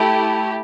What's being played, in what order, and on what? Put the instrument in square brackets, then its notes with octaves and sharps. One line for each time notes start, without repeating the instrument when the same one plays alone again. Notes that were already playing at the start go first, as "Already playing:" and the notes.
Already playing: [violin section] A3 E4 G4